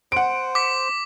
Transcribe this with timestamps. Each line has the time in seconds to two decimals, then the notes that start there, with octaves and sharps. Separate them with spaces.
0.12 C5 F#5 D7
0.55 D6 B6